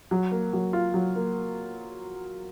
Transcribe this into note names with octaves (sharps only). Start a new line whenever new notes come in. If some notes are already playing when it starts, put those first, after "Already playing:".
F#3
A#3
F#3
F4
F#3
A#3